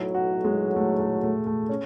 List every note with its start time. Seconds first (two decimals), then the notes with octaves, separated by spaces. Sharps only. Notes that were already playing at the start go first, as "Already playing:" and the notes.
Already playing: B1 A2 F#3 E4
0.14 F#4
0.44 G#3
0.76 A3
0.99 A3
1.23 A3
1.46 A3
1.69 C#4